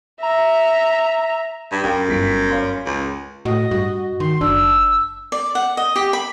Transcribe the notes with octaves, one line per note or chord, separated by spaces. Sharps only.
E5 A#5
G2
F#2 F5 G5
G1 B6 D7
C#5 F5 C6
C#2
A2 F#4 D#5
G2 F#4
D#3 C6
F#1 D4 E6
D5
F#5
D#5
G4
B5